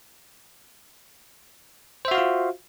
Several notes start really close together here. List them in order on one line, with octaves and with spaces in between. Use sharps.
C5 E5 F#4 F5 F4